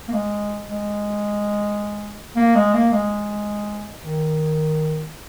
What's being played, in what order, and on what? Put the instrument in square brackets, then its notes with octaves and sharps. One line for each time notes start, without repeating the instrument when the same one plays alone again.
[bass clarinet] A#3
G#3
G#3
A#3
G#3
A#3
G#3
D#3